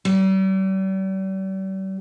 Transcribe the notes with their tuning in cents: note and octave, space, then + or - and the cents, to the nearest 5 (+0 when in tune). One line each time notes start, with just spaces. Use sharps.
G3 -40